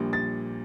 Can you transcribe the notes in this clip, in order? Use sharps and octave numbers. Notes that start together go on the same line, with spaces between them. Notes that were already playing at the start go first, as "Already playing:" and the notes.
Already playing: A#1 A#2 G3
A6